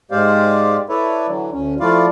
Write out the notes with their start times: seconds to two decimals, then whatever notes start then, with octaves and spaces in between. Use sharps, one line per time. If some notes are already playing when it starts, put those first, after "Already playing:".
0.11 G#2 G#3 G4 C5 D5 F5
0.89 E4 A4 B4 C#5 D5 E5
1.27 D3 E3 F#3
1.52 D2 C#4
1.80 F3 A3 E4 F4 D5 F5